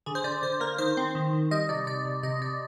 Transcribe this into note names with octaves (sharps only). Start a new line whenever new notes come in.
D3 G#4
C5
D3 D5
D3 C5
A#3 A#4
D#3 C5
C4
D#3
D#3
G3 D#5
C3 D5
C3 D5
C3
C3 D#5
C3 D5